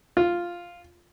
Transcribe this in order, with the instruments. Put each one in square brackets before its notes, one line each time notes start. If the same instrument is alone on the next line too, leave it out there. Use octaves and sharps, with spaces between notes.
[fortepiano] F4